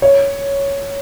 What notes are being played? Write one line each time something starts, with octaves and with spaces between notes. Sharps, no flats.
C#5